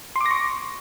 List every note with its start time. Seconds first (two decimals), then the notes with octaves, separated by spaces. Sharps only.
0.16 C6
0.21 D6
0.26 A#6
0.31 C#6